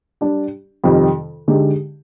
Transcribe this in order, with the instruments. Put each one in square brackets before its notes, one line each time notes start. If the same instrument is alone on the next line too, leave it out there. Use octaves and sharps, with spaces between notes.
[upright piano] G3 D4 G4
F2 C3 D#3 G3
D3 G#3 D#4 G4